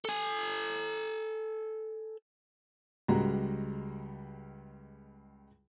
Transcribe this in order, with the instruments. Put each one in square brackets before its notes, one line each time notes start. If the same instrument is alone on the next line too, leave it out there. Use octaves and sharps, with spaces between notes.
[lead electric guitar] A4 G#5
[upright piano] C#2 G3 G#3 F#4 A#5